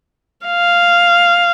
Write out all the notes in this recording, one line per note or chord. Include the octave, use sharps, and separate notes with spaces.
F5